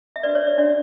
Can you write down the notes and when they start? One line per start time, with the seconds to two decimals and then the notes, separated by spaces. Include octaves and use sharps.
0.16 E5
0.23 D4 F#4 B4 D5
0.35 C#5
0.47 D5
0.58 D4 F#4 B4 D5